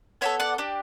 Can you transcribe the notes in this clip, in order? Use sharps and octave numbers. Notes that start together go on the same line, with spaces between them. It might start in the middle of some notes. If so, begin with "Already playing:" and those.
B3 F#4 A4 C#5 E5
D5 F#5
D4 G4